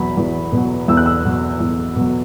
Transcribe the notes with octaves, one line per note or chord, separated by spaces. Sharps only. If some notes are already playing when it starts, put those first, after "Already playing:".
Already playing: E2 B2 F#3 B5
E2
B2
F#3
E2 E6
F#6
E6
B2 F#3
E2
B2 F#3